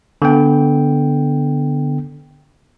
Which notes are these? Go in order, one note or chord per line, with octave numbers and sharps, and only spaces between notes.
D3 B3 G5